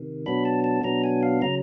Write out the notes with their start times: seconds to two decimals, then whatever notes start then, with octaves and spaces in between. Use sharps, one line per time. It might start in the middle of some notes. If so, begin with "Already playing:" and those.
Already playing: C3 D#3
0.26 B2 F#3 B3 D4 B5
0.45 A5
0.64 A5
0.83 B2 F#3 B3 D4 A#5
1.04 G#5
1.23 F5
1.42 C#3 F#3 A#5